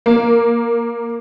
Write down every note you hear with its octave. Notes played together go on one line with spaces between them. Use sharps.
A#3